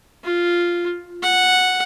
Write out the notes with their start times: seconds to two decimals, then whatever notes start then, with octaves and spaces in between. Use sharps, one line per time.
0.24 F4
1.22 F#5